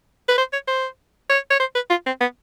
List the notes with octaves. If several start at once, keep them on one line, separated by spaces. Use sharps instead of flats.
B4
C5
C#5
C5
C#5
C#5
C5
B4
F4
C4
B3